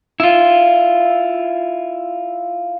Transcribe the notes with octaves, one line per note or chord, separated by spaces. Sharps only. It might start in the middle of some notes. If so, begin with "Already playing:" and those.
E4 F4